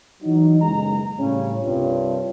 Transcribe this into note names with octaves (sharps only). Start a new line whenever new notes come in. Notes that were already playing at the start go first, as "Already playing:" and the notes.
E3 F#3 D#4
F#1 B1 G#3 A#5
A2 C#3 G3 C#4
C2 G2 D4 F4 C#5